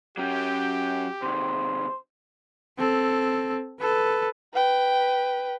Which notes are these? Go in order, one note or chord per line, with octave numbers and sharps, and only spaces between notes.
F#3 C#4 G4 G5
C3 D#3 C5
C4 A4
A4 B4
B4 G5